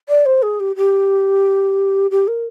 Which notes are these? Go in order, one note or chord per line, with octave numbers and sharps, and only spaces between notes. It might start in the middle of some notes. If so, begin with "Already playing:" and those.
D5
C5
G#4
G4
G4
G4
A#4